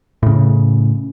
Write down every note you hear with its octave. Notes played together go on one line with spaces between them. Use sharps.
A2 C#3